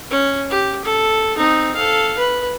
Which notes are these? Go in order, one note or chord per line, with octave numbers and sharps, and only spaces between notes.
C#4
G4
A4
C4 D#4
A4 F5
B4